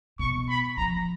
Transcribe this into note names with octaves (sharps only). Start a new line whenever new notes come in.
B2 C#6
B5
F3 A#5